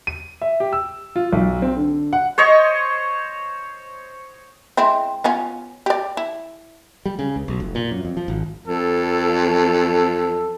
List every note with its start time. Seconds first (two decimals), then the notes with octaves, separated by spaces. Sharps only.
0.07 D#7
0.42 E5
0.60 G4
0.73 E6
1.16 F4
1.33 B1
1.62 C4
1.77 D3
2.13 F#5
2.38 C5 C#5 D#5 C#6
4.77 G#3 C4 E4
5.24 B3 C#4 F4
5.86 G4 D5
6.17 E4
7.06 G3
7.19 C#3
7.36 C#2
7.48 B1
7.60 F1
7.75 A#2
7.91 F#2
8.05 F2
8.17 F3
8.28 G#1
8.67 F2 A4